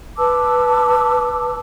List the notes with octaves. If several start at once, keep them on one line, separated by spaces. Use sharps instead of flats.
B4 A5 D6 E6